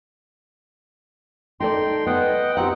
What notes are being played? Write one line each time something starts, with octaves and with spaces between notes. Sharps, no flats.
D#4 A4 D5 G5 C6
B3 D#5 F#5 G5
C4 D#4 G4 F#5